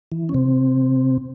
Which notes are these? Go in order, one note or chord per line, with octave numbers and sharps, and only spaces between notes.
E3
C#4
C3 C4